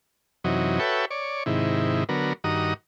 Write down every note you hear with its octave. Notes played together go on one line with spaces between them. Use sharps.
F#2 C3 E3 F#3 D#4
F#4 A4 B4 C#5 E5 G5
C#5 D5
G#2 C3 D#3 E4
D3 F#3 B3 A#4
G2 D#3 F#4 A#5 D#6